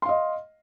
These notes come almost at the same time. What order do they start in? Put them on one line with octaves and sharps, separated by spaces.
C6 F5 D#5